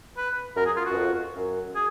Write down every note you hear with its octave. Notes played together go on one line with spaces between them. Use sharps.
B4
F#2 A#4
G#4
F4
F#2 F#4
F2
F#2
G#4